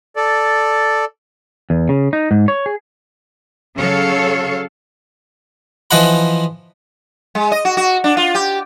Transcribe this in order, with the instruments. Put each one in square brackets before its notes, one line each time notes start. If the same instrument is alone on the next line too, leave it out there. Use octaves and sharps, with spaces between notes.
[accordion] A4 D5
[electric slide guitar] E2
C#3
D#4
G#2
C#5
G#4
[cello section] C#3 F#3 A4 C#5 F5
[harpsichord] E3 F3 D#5 F#5 B5
[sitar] G#3
D#5
F#4
F#4
D4
F4
G4